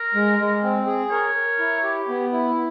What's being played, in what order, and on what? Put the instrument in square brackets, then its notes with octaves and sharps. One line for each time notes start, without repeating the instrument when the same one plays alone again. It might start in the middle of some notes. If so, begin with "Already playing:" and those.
Already playing: [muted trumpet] A#4
[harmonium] G#3
G#3
C4
G#4
[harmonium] A#4 [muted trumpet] C#5
[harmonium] A#4
E4
G4
B3
E4